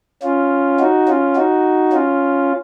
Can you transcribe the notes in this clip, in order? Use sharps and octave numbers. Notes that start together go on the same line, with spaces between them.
C#4 F4
D#4 F#4
C#4 F4
D#4 F#4
C#4 F4